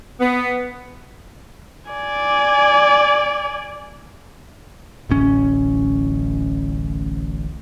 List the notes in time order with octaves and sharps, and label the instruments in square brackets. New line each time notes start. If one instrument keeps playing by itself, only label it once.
[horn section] B3
[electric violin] D5 G#5
[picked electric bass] D1 A1 C#4